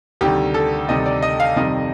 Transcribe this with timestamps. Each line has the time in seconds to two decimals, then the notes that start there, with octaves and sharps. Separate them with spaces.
0.21 D2 C3 D#3 G3 G4
0.54 A4
0.89 D2 C3 D#3 G3 D#5
1.06 D5
1.22 D#5
1.40 F5
1.56 F2 C3 D#3 G3 D#5